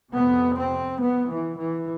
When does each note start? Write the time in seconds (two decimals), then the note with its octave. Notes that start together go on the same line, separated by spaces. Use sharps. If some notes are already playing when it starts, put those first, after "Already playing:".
0.14 F2 C3 B3
0.57 C4
1.01 B3
1.30 E3
1.59 E3